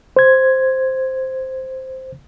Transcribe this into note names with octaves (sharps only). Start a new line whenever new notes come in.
C5 G#6